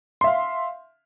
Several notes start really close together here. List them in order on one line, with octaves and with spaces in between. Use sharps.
C6 E5 F5